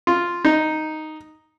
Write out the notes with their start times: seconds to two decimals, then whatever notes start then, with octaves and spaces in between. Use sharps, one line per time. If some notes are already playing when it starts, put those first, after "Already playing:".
0.07 F4
0.45 D#4